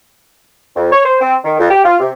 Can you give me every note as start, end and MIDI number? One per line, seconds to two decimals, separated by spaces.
0.76 0.90 41
0.92 1.02 73
1.05 1.18 72
1.21 1.35 60
1.44 1.57 51
1.58 1.68 41
1.70 1.82 67
1.84 1.95 65
1.99 2.10 48